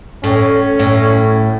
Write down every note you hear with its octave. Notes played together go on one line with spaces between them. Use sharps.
A2 C#4
A2